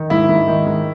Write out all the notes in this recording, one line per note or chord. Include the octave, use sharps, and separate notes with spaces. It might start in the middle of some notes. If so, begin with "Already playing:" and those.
Already playing: D#3
G#2 E4
G#2
D#3
G#2